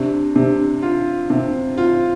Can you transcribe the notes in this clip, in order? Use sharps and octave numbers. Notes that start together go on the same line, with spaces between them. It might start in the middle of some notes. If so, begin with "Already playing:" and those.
Already playing: C3 D4 G4
C3 D4 G4
F4
C3 C4
F4